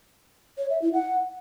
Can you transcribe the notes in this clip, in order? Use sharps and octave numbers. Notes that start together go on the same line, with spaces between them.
C#5
E5
E4
F#5